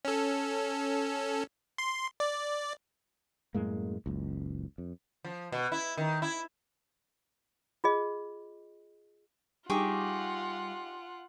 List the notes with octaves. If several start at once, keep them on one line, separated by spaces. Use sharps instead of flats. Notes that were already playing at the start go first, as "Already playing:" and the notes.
C#4 A4
C6
D5
F#2 A2 G#3 A#3
F#1 C#2
F2
F3
B2
E4
D#3
E4
F4 G#4 D#5
G3 D#4 F4 G4 G#4 F#5 C#6 D6